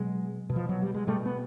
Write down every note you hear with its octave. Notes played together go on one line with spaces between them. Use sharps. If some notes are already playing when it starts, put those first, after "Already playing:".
Already playing: B2 F#3 G#3
B2
F3
F#3
G3
G#3
B2 G3 A3
B3